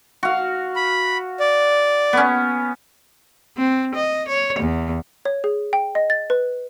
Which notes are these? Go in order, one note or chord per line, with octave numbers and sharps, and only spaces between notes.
F#4 F5
B5
D5
B3 C#4
C4
D#5
C#5
E2
C#5
G#4
G5
D#5
A6
B4